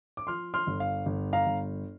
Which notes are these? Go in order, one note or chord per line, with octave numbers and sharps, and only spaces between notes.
D6
F3 C6 F6
C6 F6
G1
F5
G1
F5 A#5
G1